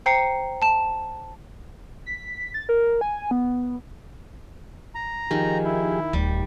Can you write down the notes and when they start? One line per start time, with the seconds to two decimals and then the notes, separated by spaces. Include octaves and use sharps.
0.06 C5 G5 A#5 C7 C#7
0.62 A5 E7
2.06 B6
2.54 A6
2.69 A#4
3.01 G#5
3.31 B3
4.95 A#5
5.31 D#3 F3 G4 G#4
5.65 E4
6.13 D1 G3